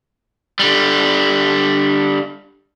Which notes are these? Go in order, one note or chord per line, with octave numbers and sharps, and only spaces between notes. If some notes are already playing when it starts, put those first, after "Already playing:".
D3 G3